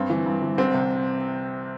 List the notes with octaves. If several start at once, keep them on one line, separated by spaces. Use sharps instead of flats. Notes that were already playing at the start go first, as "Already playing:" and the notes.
Already playing: G2 C4
E3
G2
E3
C2 C4
C3